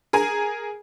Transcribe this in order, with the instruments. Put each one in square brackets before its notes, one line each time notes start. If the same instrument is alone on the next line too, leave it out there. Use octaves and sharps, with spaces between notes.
[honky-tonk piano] G#4 A#4 G#5